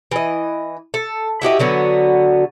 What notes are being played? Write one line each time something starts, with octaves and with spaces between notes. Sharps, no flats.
E3 D#5
A4
E4 F#4 G4 D#5
D3 F#3 B3 F#4